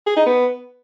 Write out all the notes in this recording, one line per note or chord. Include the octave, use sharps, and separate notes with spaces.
G#4
D#4
B3